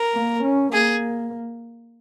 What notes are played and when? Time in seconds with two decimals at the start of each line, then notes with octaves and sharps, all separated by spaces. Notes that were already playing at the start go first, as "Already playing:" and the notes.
Already playing: A#4
0.15 A#3
0.43 C#4
0.73 A#3 G#4